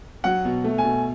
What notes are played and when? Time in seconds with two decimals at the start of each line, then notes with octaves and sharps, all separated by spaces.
0.24 F#3 F#5
0.45 B2
0.64 A3
0.78 G#5
0.85 B2